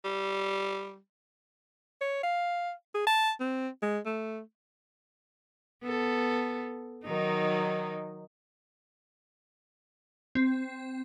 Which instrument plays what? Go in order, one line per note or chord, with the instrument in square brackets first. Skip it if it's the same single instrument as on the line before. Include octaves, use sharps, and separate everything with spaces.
[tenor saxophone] G3
[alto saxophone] C#5
F5
G#4
A5
C4
G#3
A3
[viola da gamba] B3 A4
D#3 F#3 D#4
[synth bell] C4